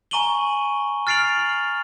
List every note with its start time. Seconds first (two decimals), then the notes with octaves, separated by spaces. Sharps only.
0.11 G#5 A#5 C#6 D#7 F#7 G7
1.07 F6 A6 C7 D7 F7 F#7